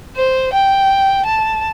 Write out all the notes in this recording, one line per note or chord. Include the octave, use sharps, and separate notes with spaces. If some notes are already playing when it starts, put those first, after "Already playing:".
C5
G5
A5